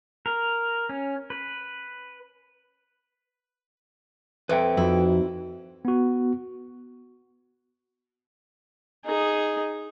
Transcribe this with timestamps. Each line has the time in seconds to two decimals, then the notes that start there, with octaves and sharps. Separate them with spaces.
0.26 A#4
0.89 C#4
1.30 B4
4.49 F2 B4 E5 G5
4.77 F2 D#4 E4 F#4
5.85 B3 F#4
9.05 D#4 G#4